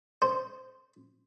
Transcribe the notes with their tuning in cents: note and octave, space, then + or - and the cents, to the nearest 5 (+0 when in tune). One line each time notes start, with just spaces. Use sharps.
C5 -10